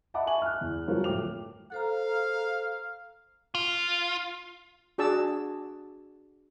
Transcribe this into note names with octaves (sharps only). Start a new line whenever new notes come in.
D#5 E5 F#5 A5 B5 D6
E5 G#5 C#6 F#7
F6 F#6
E2
F3 G3 F#4 A#4 C#5
D1 A3 G5 D6 F7
A4 C5 F5 A#5
F4
D4 F#4 G#4 D5 A5 E6